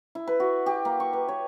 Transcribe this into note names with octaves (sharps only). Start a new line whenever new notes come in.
E4
B4
F#4
G4
A#3
C#6
B4
C#5